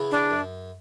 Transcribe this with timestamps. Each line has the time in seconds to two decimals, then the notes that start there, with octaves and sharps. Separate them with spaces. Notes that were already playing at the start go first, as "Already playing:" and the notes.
Already playing: C#3 E3 B3
0.11 D4
0.30 F#2